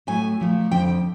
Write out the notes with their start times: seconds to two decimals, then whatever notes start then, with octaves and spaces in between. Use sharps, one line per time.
0.07 A2 F#3 A3 G#5
0.40 A#2 F3 A3
0.71 F2 D3 F3 G5